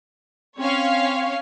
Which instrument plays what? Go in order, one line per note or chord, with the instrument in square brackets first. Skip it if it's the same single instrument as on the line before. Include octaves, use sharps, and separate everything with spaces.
[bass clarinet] C4 [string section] C#4 C#5 F5